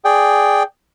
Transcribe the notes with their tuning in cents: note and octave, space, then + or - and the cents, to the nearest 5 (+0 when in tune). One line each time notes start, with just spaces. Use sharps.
G#4 +0 D5 +0 G5 +0